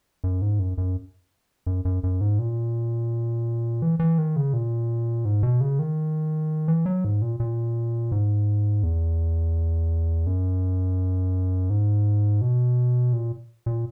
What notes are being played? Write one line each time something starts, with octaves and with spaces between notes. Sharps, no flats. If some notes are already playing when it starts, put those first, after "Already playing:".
F#2
G#2
F#2
F#2
F#2
F#2
F#2
G#2
A#2
E3
E3
D#3
C#3
A#2
G#2
B2
C#3
D#3
E3
F#3
G#2
A#2
A#2
G#2
E2
F#2
G#2
B2
A#2
A#2